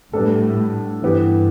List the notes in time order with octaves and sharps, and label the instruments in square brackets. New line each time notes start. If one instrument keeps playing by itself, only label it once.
[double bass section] A2 [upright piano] G3 B3 D4 A4
[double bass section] G2 [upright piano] E3 B3 G4